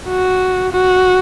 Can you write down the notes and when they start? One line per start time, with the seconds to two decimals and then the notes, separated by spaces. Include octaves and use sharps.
0.09 F#4
0.73 F#4